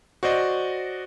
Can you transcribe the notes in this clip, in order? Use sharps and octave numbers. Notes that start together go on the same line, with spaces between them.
F#4 C5 D5 D#5